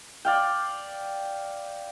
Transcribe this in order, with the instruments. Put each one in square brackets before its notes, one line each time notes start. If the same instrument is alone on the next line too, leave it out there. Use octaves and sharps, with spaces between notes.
[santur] D5 F5 G5